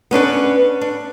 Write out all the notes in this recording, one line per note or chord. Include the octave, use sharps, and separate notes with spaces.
B3 C#4 D4 B4
D4